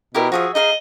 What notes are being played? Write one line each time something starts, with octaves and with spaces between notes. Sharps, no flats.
B2 E4 G4 A#4
F3 F#4 G#4 E5
D#4 G#4 D#5 F5